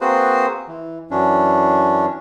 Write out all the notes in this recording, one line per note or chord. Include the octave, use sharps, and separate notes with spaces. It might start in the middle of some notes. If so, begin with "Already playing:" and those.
A#3 C4 F#4 G#4 B4 C5
E3
F#2 E3 C#4 D4